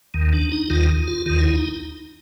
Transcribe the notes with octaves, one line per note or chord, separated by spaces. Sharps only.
D#2 D#3
D4
D#4
D#2 D#3 F4
F4
D#2 D#3 F4
E4
D#4